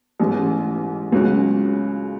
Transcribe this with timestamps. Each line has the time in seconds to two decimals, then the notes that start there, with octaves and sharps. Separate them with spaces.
0.20 A1 G#2 E3 G#3 C#4
1.12 C#2 C#3 F#3 C#4 F#4